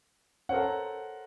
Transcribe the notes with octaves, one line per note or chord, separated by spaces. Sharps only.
A4 A#4 C5 C#5 F#5